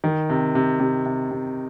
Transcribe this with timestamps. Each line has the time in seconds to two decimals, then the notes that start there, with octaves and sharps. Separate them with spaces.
0.04 D#3
0.30 C3
0.55 C3
0.80 C3
1.06 C3
1.31 C3